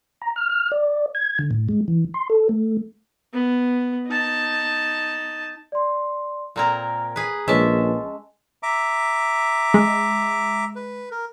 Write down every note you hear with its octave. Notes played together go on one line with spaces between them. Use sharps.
A#5
F6
F6
D5
G#6
D3
A2
G#3
E3
C6
A4
A3
B3
D#4 A5
D5 C6
A#2 C4 A#4 G#5 A#5 G#6
G#4 B4
A#1 G#3 C#4 B4 C#5 E5 A5
E5 A#5 D6
G#3
B4
A#4